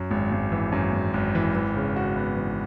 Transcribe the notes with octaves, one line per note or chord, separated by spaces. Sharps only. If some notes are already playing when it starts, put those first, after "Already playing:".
Already playing: F#2
G#1
G#1
E3
F#2
G#1
G#1
E3
E3
C#3
F#4
B3
E3